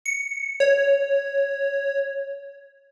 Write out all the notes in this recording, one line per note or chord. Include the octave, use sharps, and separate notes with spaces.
C#7
C#5